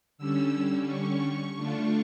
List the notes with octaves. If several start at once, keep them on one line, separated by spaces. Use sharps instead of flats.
D3 G3 C#4 E6
C#6
D3 A3 D4 F4